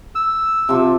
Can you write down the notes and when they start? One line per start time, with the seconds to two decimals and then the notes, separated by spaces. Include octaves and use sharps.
0.15 E6
0.69 C3 F3